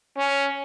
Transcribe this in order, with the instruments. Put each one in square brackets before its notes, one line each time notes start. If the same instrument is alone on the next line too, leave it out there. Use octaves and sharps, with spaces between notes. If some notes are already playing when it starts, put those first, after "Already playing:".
[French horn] C#4